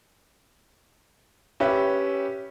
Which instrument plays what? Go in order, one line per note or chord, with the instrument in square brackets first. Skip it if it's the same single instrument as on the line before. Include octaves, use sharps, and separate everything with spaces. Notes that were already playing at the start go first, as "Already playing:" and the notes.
[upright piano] C#4 G4 B4 E5